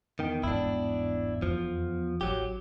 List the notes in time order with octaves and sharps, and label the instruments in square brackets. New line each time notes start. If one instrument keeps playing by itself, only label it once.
[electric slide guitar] E2 B3 G5 [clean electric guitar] D#3
[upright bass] G1 G#2 [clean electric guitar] D4 E4
[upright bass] F2 [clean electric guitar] F3
[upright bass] A1 [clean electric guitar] F#3 G4